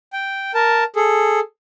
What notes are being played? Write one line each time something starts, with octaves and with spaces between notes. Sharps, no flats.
G5
A#4 A5
G#4 A4